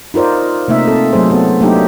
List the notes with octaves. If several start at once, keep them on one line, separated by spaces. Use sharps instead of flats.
D#4 F4 A#4 C5 D5
C3 A3 A#3 D#4 E5
A#3 C4 A4
F#3 A3 G#4 C5
B3 A4
F#3 A3 A#3 D4 D#4 G4